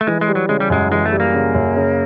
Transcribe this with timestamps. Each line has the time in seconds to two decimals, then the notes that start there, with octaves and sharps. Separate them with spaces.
0.01 A3
0.07 E3 G#3
0.21 G#3
0.28 G3
0.35 F#3
0.49 C#3 G#3
0.60 G3
0.70 F#2 G#3
0.91 E3 G#3
1.05 A3
1.12 G3
1.20 A#3
1.34 C#3
1.54 F#2
1.76 C#3